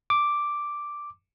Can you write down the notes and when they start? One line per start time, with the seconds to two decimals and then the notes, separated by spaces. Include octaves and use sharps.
0.10 D6